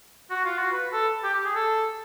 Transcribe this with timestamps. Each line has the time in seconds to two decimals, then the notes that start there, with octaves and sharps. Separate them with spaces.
0.31 F#4
0.45 F4
0.58 F#4
0.72 B4
0.93 A4
1.24 G4
1.34 G4
1.45 G#4
1.55 A4